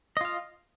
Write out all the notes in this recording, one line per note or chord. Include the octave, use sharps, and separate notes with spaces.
F4 D#5 F5